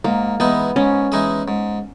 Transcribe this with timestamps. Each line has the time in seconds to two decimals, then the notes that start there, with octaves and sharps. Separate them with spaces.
0.05 G#2 A#3
0.40 E3 G#3 B3 D#4 G#4
0.76 G#2 C#4
1.12 E3 G#3 D#4 G#4
1.48 G#2